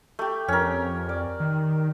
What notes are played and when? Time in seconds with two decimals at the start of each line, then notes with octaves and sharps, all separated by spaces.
0.19 A3 G4
0.48 F2 C#4 A#4
1.09 D5
1.40 D#3